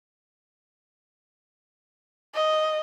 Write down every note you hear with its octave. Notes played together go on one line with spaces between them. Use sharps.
D#5